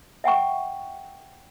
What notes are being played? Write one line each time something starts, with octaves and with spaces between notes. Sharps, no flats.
E5 F#5 G5 C#6